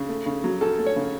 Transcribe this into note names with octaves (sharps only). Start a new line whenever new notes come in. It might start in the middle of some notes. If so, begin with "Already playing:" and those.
Already playing: C#3
A3
C#3
F#3
F#2 A4
A3
C#5
C#3